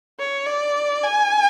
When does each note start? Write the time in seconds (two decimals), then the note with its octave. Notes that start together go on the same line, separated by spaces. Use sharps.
0.19 C#5
0.47 D5
1.04 G#5